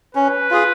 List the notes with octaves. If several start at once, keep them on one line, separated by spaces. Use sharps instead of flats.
C#4 B4
F4 G#4